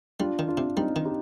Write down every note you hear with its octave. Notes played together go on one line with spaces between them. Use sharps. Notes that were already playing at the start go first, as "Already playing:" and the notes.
G3 D4 F4
D#3
D4 F4
C3
G3 C4 D#4
D#3
D#4 G4